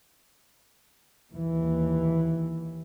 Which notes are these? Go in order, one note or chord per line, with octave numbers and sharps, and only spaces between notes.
D#2 E3